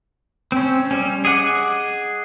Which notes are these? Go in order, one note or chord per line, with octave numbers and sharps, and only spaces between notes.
C4 C#4
G3 C#4
G#4 D#5 F#5 D6